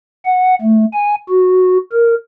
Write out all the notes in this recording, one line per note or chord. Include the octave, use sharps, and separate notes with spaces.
F#5
A3
G#5
F#4
A#4